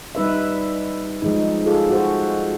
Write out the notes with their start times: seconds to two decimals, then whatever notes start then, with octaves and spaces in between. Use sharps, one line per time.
0.15 G3 D#4 B4 E5
1.22 F3 G#3 D#4
1.66 F4 G#4 A4
1.90 F#4 C5